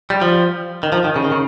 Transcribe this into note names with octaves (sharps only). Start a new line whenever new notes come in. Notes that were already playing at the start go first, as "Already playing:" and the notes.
G3
F3
D#3
F3
D#3
C#3
D#3
C#3